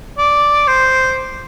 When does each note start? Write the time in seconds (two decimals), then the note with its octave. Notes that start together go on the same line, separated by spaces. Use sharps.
0.18 D5
0.67 C5